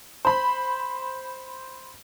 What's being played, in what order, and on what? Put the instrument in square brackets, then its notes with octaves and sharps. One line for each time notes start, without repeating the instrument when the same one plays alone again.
[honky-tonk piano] C5 B5